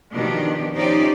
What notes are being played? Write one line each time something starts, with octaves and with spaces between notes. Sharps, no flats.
B2 D#3 F3 D4 G4
F3 C#4 D#4 G4 C5 D5